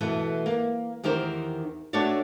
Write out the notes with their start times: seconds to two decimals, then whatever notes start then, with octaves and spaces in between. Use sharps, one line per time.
0.01 B2 E3 A3 B3
0.46 A#3
1.03 E2 D#3 G4 A#4 C5
1.93 A3 D4 F#4 C#5 D5